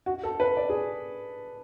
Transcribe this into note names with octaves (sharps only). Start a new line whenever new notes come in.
F#4
A4
B4
D5
G#4